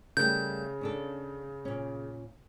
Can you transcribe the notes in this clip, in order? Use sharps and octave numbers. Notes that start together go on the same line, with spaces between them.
C#3 G3 A3 A#4 G6
C#4 D4 A4
A#2 C#4